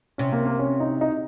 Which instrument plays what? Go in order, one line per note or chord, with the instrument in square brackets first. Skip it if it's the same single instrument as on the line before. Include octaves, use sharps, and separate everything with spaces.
[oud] C3 [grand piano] C#4
[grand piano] A#3
A#3
C#4
D#4
D#4